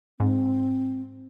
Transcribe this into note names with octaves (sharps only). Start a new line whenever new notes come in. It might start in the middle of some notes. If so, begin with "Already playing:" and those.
G#2 C4